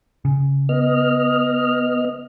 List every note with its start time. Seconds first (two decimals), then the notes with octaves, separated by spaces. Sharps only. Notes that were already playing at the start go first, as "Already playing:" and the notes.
0.25 C#3
0.69 B3 D#5 F6